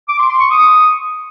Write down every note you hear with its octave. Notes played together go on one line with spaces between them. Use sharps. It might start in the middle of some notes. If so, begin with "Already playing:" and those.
D6
C6
C6
C#6
D#6